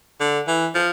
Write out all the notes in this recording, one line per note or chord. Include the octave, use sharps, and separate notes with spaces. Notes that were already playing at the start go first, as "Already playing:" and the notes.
D3
E3
F3